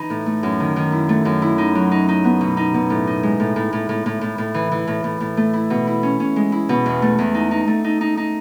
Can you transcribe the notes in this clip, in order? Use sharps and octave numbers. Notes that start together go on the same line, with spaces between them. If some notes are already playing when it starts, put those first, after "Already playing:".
Already playing: E3 D#4
A2
A3
F#2
D#3
D#3
E4
A3
F#2
E4
D#4
F#3
D#4
D#4
B3
B2
D#4
B2
A2
D#4
G#3
A2
A2
A2
A2
A2
A2
A2
E3
E3
A2
A2
A2
A3
E4
B2
E4
C#4
C#4
G#3
E4
B2
E2
A3
E2
D#4
D#4
A3
D#4
D#4
D#4